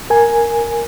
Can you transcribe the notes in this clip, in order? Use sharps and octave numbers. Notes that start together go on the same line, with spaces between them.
A#4 G#5